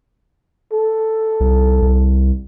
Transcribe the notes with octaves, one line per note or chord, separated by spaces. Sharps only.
A4
C2
C2